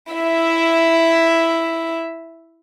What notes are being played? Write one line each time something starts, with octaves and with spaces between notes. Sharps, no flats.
E4 E5